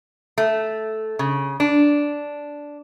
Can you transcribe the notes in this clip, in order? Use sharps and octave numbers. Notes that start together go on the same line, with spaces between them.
A3
C#3
D4